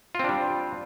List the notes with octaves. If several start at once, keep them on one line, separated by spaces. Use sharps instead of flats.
G3 C4 D4 F4